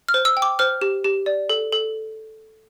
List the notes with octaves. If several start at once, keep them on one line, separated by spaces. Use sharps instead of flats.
F6
C5
E6
G5
D6
C5 F6
G4
G4
D5
A4
A4